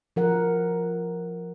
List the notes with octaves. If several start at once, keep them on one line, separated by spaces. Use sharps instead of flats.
F3 A#4 F#5